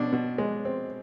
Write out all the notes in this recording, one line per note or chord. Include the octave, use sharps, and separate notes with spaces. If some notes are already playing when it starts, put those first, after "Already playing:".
Already playing: B2 D4
B2
G#3
C4